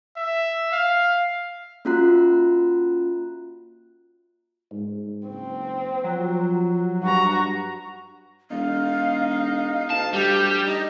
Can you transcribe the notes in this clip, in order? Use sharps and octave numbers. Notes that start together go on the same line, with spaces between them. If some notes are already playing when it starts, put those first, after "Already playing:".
E5
F5
A#3 C#4 F4 F#4 A#5 F#6
G#2
F#1 C4
F3 F#3
G2 F#4 A#5
E1 D#4 F5
D2 A5
G3 G4
D#4 D#5